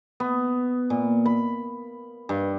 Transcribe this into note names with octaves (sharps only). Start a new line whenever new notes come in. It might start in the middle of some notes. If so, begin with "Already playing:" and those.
B3
A#2
B5
G2